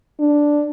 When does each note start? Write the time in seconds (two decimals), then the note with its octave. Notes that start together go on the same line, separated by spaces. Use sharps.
0.20 D4